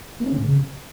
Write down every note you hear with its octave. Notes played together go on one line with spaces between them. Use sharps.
A#3
C#4
D3
A2
C#3